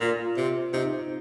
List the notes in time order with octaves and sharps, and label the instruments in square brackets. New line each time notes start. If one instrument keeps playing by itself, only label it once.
[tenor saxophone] A#2 [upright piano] F4
[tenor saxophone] C3
[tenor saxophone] C3 [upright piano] D#4